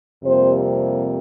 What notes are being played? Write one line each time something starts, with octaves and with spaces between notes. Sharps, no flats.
F2 C3 G3 A#3 C5